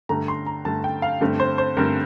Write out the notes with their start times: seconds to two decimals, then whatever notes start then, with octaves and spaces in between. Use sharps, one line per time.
0.09 G2 D3 A3 A#5
0.28 C6
0.46 A#5
0.65 G2 D3 A3 A5
0.84 G5
1.02 F5
1.21 G2 D3 A3 C4
1.40 C5
1.58 C5
1.77 G2 D3 A3 C4 A#4